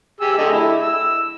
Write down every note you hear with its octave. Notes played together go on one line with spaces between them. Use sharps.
G4 G#4 E6
D3 A3 D#5
E4
E6